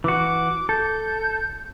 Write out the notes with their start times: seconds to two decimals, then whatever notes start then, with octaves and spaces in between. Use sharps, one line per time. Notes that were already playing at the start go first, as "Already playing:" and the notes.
0.04 E3 F#4 D6
0.69 A4 G6